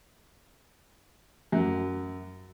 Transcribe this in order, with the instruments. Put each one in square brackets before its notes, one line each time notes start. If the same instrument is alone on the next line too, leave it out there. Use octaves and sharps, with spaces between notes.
[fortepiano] F#2